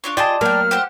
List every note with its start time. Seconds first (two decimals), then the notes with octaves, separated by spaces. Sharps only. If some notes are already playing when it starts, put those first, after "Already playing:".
0.04 D4 F4 C#5
0.17 F4 G#4 D5 D#5 G5 A5
0.41 F#3 A#3 A#4 G5 F6
0.71 G4 C5 F#5